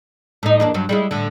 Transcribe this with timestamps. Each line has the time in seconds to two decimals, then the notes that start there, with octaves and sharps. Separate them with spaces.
0.43 A2 D#4
0.60 E2 A#3 D4
0.74 G2 F#3
0.89 G3 G#3 E4
1.11 A2 D3